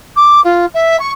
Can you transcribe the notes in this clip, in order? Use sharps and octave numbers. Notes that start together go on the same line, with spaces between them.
D6
F4
E5
C#6